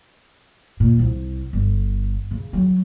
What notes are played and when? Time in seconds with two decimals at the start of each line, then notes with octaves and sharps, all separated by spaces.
0.80 A#2
0.99 C2
1.53 G1
2.31 C#3
2.53 F#3